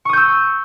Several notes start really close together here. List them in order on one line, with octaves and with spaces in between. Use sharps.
C#6 D#6 G6 E6